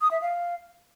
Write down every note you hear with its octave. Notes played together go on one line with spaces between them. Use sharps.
D#6
E5
F5